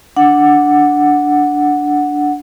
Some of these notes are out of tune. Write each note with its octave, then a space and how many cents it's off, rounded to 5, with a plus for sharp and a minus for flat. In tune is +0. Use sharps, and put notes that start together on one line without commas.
D4 +0 F#5 +0